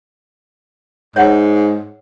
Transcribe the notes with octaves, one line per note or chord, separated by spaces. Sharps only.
G#2 C#5 E5 F#5